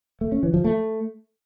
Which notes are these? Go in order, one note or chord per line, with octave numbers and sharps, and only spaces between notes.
A3
C#4
E3
F3
A3